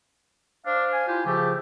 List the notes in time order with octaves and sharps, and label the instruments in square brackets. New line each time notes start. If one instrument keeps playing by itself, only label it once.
[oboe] D4 [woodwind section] C5 F5
[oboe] G#5
[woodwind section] E4 F4 G4
[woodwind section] C#3 F3 A3 [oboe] G4